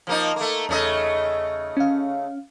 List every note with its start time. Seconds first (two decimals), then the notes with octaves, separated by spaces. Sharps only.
0.07 F3 A#3 D#4
0.36 A3 A#3
0.69 E2 C#3 A3 D#5
1.77 C#4 F5